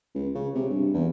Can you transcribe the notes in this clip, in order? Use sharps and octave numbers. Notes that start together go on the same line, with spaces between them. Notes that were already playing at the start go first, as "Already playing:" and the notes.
C#2
C#3
C3
G2
E2